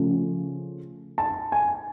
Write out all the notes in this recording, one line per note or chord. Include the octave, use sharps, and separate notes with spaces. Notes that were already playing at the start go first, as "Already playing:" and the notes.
Already playing: C#3 F3 A3 C#4
A5
G#5